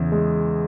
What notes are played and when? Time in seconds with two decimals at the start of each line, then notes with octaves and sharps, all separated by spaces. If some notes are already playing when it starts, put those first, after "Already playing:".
Already playing: E2 C#3
0.12 G#3